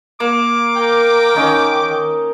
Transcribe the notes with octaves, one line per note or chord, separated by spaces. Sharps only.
A#3 D6
A#4 G5
D#3 C#4 D#4